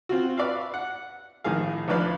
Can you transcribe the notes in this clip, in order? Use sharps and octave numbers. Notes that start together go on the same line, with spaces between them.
C4 F4 F#4
B4 D5 E5 F5
F#5
A#1 A2 D#3 G#4 F5
A1 D3 F3 B4 D5 F5